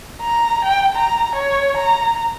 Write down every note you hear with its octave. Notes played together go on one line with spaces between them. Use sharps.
A#5
G5
A#5
C#5
A#5